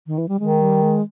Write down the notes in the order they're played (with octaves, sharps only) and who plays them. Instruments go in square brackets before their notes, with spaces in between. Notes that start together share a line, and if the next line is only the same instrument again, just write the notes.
[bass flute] D#3
E3
G3
[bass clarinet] D#3 [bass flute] G#3
[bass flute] G3
G#3